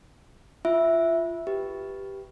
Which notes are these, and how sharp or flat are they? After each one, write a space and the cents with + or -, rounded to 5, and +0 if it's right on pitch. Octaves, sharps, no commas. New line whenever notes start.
F4 -20 E5 +0
G4 +0 B4 +0